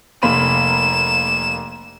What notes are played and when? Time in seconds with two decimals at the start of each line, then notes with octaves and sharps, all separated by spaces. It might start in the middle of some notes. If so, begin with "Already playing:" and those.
0.23 F1 A#3 B5 E7